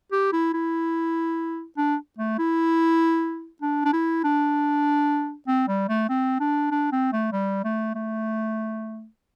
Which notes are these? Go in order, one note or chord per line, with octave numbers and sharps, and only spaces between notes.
G4
E4
E4
D4
A3
E4
D4
D4
E4
D4
C4
G3
A3
C4
D4
D4
C4
A3
G3
A3
A3